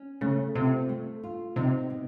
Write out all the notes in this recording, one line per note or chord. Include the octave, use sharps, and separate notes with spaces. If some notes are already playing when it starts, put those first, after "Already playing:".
Already playing: C#4
C#3 A3
C3 F4
A3
F4
C3 D#4
B2